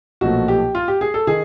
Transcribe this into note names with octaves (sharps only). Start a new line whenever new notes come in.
B1 A#2 F3 A3 F#4
G4
F4
G4
G#4
A4
D#3 G#4